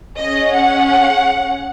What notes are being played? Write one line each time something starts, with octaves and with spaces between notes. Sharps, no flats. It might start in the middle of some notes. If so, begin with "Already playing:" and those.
C#4 G#4 D#5
F#5